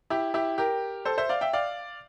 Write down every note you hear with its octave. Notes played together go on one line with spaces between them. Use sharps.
E4 G4
E4 G4
G4 A#4
A4 C5
C5 E5
D5 F5
E5 G5
D5 F5